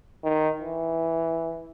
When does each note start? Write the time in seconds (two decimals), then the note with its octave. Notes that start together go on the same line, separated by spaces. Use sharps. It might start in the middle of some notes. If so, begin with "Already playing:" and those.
0.24 D#3
0.62 E3